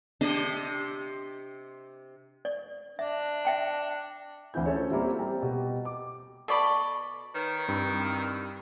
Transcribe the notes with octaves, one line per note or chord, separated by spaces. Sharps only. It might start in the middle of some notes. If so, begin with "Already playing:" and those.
C3 D4 G4 D#5
D5
D4 E5
E5 G5 A5
D2 E3 C4 E4 G6
C#4 F4 A4 C5 C#5
G3 A#3 C4 E4 F#4 A4
G3 C4 G5 A#5
B2 G4
D6
B2 A4 D5 A5 B5 C#6
D#3 B4 C#5
G2 C4 E4